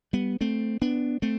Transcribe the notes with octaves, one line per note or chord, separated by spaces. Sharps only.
G3 B3
A3 C4
B3 D4
A3 C4